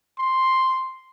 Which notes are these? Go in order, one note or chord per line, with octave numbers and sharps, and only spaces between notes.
C6